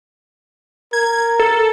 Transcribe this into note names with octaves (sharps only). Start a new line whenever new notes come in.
A#4 G#6
A4